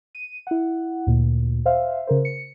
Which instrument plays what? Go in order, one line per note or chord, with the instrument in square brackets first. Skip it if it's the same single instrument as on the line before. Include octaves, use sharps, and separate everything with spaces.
[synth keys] D#7
E4 F#5
D2 A#2
C5 E5 F5
C#3 A#4 C5
C#7